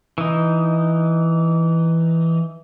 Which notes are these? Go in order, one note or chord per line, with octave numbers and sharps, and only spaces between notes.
E3 D#4